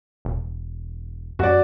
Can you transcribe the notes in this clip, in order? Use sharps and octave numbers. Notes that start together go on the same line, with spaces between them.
E1
F#2 F#4 D5